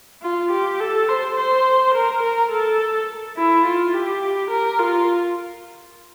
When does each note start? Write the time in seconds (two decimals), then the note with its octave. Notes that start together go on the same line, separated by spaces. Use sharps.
0.22 F4
0.51 G4
0.80 A4
1.08 C5
1.37 C5
1.94 A#4
2.22 A#4
2.51 A4
3.37 E4
3.65 F4
3.93 G4
4.51 A#4
4.79 F4